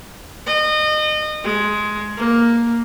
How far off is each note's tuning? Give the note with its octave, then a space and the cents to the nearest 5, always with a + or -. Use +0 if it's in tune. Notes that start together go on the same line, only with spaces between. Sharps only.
D#5 -30
G#3 +15
A#3 +5